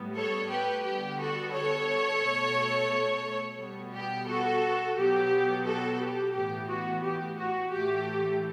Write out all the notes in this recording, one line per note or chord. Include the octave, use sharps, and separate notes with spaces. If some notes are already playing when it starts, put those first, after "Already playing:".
Already playing: A2 G3 B3
A4 C#5
G4 B4
D3 G3 B3 G4
F#4 A4
A4 C#5
B2 A3
B2 G3 B3
G4
F#4 A4
B2 F#3 B3 G4
F#4 A4
G4
A2 E3 B3 G4
F#4
G4
F#4
A2 E3 A3 G4